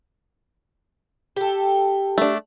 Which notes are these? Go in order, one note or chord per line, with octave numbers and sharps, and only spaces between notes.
G4 A4
A3 D4